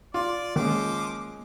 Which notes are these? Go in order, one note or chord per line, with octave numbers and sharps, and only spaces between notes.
F4 D5
D#3 F3 G#3 A#3 C#4 D6